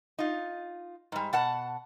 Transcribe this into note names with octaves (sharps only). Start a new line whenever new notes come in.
D#4 F4
G#2 G3
B2 F#5 A5